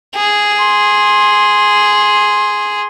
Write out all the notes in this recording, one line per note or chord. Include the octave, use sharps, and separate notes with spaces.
G#4
C6